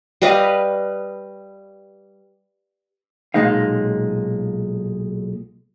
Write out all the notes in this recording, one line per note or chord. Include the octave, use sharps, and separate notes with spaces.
G3 B4 D#5 F5
B1 A#2 G#3 D#4 F5